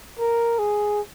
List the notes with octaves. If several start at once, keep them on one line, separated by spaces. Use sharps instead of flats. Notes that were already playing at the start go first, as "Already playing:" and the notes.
A#4
G#4